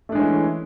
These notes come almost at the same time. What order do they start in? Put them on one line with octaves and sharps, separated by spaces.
A3 D4 G#3 C#4 E3